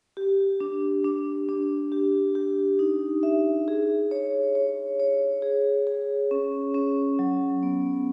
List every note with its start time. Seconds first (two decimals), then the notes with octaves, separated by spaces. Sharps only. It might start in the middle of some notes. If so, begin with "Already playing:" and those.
0.17 G4
0.60 D4
1.04 D4
1.49 D4
1.92 G4
2.35 G4
2.79 D#4
3.23 E5
3.68 G#4
4.11 C#5
4.55 C#5
5.00 C#5
5.42 G#4
5.87 G#4
6.31 C#4
6.75 C#4
7.19 F#3
7.63 B3